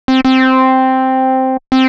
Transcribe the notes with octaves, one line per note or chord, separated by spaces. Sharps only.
C4
C4
C4